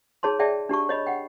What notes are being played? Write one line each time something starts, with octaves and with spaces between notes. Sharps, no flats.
D#4 G#4 C#5 A5 C6
G#4 D5 E5 G5 A5
D4 G4 A5 C#6
C#5 D#5 B5
F#5 G5